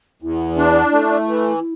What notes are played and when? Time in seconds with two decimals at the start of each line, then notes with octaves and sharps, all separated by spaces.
0.22 E2 E4
0.57 D4
0.93 A3
1.28 E3